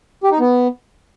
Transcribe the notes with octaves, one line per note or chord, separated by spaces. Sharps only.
G4
D#4
B3